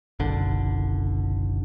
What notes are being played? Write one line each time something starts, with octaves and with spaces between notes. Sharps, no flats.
F#1 B1 D3